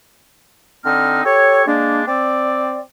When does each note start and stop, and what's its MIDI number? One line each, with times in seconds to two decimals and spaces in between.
0.85 1.23 50
0.85 1.23 60
0.85 1.23 63
0.85 1.23 89
1.25 1.63 67
1.25 1.63 69
1.25 1.63 73
1.67 2.03 56
1.67 2.03 58
1.67 2.03 62
2.08 2.81 60
2.08 2.81 74